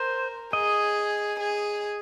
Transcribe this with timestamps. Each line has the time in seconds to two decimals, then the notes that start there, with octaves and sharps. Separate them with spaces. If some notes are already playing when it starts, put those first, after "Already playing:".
Already playing: A#4 C5
0.53 G#4 D#5
1.40 G#4